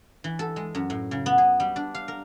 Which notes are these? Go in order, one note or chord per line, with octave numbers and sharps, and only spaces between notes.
E3
A4
G#3
F#2
A2
C#3
B3
G#4
G3
D4
F5
A#4